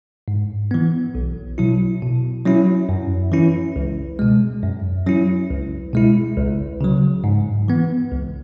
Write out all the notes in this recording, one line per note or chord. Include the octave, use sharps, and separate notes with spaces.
G#2
E3 B3
B1
B2 F#3 E4
B2
F#3 C#4 E4
F#2
E3 C#4 E4
C#2
B2 G#3
F#2
F#3 C#4 E4
C#2
B2 G#3 E4
C#2
C#3 F#3
G#2
E3 B3
C#2